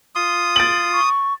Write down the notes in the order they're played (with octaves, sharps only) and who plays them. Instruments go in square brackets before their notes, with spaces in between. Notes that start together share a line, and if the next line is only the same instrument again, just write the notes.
[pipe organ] F4 C6 [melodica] D#6
[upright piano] A6 D7 F#7
[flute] C#6